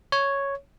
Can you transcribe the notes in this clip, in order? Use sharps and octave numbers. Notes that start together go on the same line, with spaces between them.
C#5